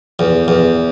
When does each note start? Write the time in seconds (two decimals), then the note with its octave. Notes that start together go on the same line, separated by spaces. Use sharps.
0.19 E2
0.48 E2